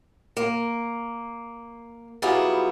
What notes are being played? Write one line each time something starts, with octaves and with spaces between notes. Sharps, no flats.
A#3
F#3 G3 B3 E4 F4 G#4